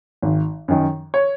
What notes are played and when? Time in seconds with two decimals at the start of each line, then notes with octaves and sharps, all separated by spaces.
0.22 G#1
0.68 F#2 D#3
1.14 C#5